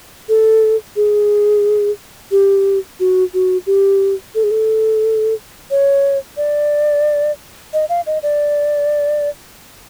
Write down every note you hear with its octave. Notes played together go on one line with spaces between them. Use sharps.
A4
G#4
G4
F#4
F#4
G4
A4
G#4
A4
C#5
D5
D#5
F5
D#5
D5